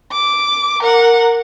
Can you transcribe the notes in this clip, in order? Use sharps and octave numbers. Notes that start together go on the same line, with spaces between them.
D6
A#4 F#5